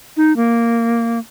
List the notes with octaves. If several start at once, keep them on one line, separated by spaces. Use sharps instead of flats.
D#4
A#3